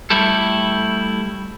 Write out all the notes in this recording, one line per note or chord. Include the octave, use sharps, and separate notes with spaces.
G3 A3 E4 G4 A4